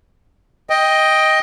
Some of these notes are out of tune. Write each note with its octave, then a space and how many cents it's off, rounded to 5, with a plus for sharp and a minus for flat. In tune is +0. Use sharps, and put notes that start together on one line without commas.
D#5 +10 G5 +10